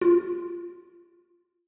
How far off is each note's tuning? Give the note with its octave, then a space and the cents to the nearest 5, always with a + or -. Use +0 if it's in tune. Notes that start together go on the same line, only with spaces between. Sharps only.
F4 -15